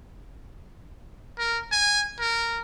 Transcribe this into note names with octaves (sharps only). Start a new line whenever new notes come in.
A#4
G#5
A#4